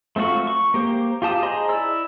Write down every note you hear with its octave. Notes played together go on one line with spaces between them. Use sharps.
A3 C4 F4 F#4 C#6
C#6
A#3 G4 C5
F4 G4 A5 D#6
G#4 C5 D#5 A#5 C6
E4 D5 E6